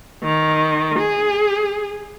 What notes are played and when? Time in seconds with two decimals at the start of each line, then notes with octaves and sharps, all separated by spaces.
0.23 D#3
0.99 G#4